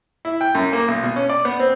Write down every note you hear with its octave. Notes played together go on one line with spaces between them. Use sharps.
E4
G5
F#2
A#3
B1
B2
C#4
D5
B3
C4